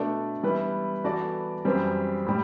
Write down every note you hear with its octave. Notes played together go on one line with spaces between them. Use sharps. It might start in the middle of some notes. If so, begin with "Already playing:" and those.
Already playing: B2 A3 D4 A4 D5
E3 G3 B3 E4 B4
E3 B3 F#4 A4 D5
F#2 E3 G3 C4
A2 G3